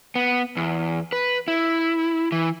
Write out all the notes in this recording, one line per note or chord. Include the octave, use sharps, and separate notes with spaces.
B3
E2
B4
E4
E3